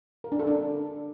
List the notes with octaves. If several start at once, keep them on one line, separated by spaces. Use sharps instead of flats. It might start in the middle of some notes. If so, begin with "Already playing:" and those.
A#4
D4
A4
D4